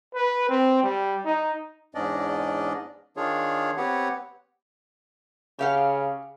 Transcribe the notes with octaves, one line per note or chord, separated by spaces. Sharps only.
B4
C4
G3
D#4
E2 G#2 C#4 D4 D5 D#5
D#3 D4 F4 G#4 C#5
B3 C4 G4 B4 C#5 F#5
C#3 G4 F5 F#5